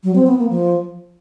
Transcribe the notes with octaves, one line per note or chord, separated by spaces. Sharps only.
F#3
C4
B3
A#3
F3